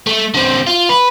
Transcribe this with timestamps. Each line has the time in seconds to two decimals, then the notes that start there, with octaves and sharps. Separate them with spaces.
0.07 A3
0.34 D3 C4
0.67 F4
0.89 B4